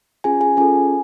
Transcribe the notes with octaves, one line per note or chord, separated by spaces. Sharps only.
C#4 F4 G#4 G#5
G#4 G#5
C#4 F4 G#4 A4 G#5